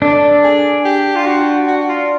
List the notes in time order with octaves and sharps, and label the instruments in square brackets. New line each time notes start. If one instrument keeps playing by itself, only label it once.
[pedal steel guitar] D4 [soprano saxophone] A4
[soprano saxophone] G#4
G4
F4
F#4
F#4
F4